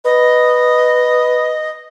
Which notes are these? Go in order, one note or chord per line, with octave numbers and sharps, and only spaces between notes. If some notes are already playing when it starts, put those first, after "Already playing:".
B4 D#5